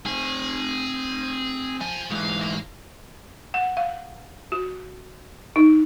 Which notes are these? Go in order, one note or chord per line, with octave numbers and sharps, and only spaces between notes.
C4 G#4 G#5
F3 G#5
G#2 E3 F5
A#4 F5
F#5
F5
F#4
D#4